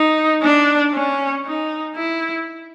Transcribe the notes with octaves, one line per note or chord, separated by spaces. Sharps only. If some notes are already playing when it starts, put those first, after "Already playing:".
Already playing: D#4
D4
C#4
D#4
E4